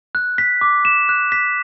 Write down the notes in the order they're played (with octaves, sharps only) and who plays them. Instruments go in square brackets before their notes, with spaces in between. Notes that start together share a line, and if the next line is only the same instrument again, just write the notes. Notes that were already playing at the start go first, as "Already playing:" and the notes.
[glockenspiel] F#6
B6
D6
E7
F#6
B6